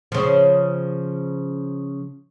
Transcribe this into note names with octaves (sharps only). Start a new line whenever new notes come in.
C#3 F3